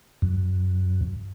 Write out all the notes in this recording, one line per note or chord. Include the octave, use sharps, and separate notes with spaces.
F#2